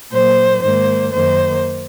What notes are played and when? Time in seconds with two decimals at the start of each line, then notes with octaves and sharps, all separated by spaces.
0.11 A#2 F#3 A#3 C5
0.61 G#2 D#3 A#3 C5
1.12 F#2 D#3 A#3 C5